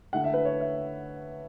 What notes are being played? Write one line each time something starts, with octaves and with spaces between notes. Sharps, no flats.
D3 A3 E4 F#5
E5
B4
C#5
E5